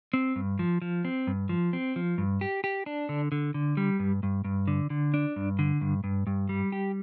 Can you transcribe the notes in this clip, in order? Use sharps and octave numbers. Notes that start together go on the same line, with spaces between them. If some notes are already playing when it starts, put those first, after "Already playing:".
C4
G2
F3
F3
C4
G2
F3
C4
F3
G2
G4
G4
D4
D3
D3
D3
G3
G2
G2
G2
D3
D3
D4
G2
D3
G2
G2
G2
G3
G4